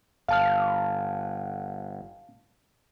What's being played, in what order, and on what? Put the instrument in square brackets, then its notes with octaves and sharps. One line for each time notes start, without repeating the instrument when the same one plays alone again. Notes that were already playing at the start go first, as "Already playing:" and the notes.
[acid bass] G1 [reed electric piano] F5 A5 F6